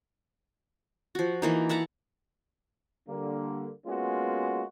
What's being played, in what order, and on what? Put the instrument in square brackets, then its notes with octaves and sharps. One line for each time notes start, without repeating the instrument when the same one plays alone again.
[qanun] F3 F#4
E3 A#3 D#4
E5 F#5 A5 A#5
[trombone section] D3 G3 A#3
G#3 A#3 B3 C#4 F4 F#4